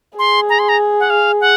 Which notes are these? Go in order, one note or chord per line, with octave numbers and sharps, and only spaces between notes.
G#4 C6
A#5
C6
A#5
F#5
F5
F#5